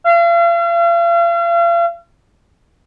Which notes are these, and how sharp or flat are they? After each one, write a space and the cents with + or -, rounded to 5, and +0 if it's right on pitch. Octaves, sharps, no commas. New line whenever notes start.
F5 -40